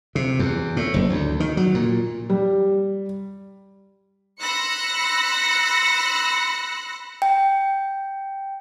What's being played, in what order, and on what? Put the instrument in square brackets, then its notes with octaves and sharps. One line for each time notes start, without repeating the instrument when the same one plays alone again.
[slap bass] C3
E2
A2
F#1
D2
D#3
F#3
A#2
[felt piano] G3
[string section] B5 C6 E6 F#6 A#6 C#7
[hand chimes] G5